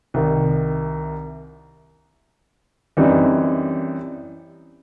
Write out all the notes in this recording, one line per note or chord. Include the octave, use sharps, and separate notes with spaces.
C2 C3 D#3
F#2 E3 G3 C4 D#4